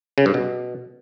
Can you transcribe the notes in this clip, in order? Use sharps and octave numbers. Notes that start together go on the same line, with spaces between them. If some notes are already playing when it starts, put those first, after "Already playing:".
C#3
G2
B2